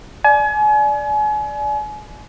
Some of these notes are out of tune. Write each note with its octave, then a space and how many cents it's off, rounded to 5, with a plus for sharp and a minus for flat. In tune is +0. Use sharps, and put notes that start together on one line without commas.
D5 +0 G#5 +35